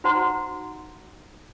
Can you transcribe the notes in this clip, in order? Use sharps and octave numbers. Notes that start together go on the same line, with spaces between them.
D#4 F#4 C5 F#5 A#5 C6